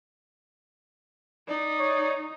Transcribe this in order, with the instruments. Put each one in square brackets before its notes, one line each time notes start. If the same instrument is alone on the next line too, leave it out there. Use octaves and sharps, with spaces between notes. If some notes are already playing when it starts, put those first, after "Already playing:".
[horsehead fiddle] D#4 [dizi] D5
[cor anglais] C#5